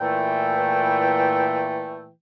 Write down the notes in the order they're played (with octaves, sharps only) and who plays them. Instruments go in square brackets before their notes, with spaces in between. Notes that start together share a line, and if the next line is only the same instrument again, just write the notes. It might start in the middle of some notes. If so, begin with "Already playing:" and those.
[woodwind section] A#2 E3 A3 G5